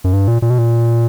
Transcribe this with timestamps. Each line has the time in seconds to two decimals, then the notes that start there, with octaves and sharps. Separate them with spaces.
0.04 F#2
0.13 G2
0.28 A#2
0.42 A#2
0.50 B2
0.58 A#2